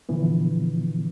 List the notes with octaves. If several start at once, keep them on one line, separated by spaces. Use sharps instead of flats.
A#2 D3 E3 F3 B3